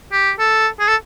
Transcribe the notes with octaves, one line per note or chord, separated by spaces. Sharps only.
G4
A4
G#4
A4